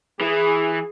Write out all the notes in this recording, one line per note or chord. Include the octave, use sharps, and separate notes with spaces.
E3 G#4